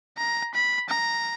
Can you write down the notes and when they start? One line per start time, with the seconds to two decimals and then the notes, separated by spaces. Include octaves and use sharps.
0.18 A#5
0.54 B5
0.89 A#5